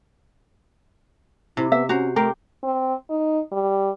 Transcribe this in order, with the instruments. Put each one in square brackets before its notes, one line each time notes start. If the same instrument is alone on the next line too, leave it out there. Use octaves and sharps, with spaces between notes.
[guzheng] C3 [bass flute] E4
[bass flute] B3 [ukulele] E5
[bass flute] C#4 [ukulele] F#4 [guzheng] C5 A#5
[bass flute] A3 [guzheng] G4 G5 C6 [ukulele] A#4
[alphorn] C4
D#4
G3